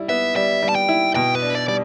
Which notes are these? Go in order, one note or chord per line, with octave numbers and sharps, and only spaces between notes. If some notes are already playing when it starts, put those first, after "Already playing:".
Already playing: G3 E4
B3 E5
G3 E5
G3
A5
G5
E4
B2 G5
B4
D4
D5
G3 D5